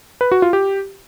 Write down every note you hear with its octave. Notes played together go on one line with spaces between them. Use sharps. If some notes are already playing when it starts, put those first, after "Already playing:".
B4
F#4
F4
G4